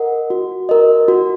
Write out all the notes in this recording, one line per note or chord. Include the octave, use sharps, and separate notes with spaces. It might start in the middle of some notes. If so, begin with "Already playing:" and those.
Already playing: A#4 D#5 F#5
F#4
A#4 D#5
F#4